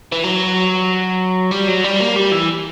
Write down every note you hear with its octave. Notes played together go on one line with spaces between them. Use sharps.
E3
F#3
G3
F#3
G3
A#3
G3
E3